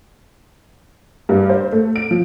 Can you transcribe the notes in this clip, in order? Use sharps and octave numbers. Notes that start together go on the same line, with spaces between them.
G2
C5
A3
D7
F3